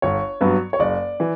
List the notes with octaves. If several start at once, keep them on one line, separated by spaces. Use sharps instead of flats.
G1 C#5
G2 F#3 B3
C#5
F#1 D5
E3